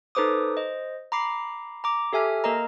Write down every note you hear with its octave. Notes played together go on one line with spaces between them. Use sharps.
D#4 A4 B4 C5 D6 D#6
C5 D#5
A#5 B5 D6 C7
A#5 D6
G4 A4 E5 G#5 F6
A#3 A#4 D#5 A#5